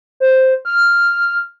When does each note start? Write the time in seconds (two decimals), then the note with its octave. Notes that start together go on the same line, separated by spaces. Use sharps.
0.20 C5
0.65 F6